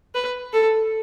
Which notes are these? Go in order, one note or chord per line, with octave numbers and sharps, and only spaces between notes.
B4
A4